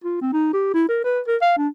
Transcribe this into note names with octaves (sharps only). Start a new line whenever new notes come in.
F4
C4
D#4
G4
E4
A#4
B4
A#4
F5
D4